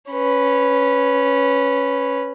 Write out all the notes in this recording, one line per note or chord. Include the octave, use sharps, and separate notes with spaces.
C#4 B4